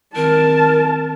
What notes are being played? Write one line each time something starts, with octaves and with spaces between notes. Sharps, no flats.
D#3 C4 A#4 A5